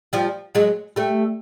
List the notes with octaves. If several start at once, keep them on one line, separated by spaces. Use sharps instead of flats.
F3 G3
F#3 G#3
G3 A3